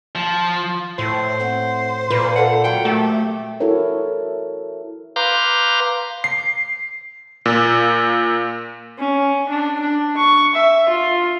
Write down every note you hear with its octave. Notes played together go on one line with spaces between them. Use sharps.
F3
A2 C5
C4 F#5
G2 A#2 B4
A4 F5 F#5
G#2 F#3 A#3 G5
A3 G4
E4 F#4 A4 A#4 C#5
B4 F5 A#5 C6 D6 G6
C7
A#2
C#4
D4
D4
C#6
E5
F4